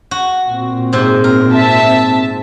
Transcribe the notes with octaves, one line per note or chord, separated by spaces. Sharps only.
F#4
A#2 C4
G#2 C3
A#4
E5 A5